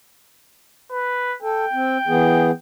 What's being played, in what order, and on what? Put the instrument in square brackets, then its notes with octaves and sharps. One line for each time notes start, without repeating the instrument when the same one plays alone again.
[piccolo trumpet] B4
[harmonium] A4 [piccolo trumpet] G5
[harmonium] C4
E3 B3 G#4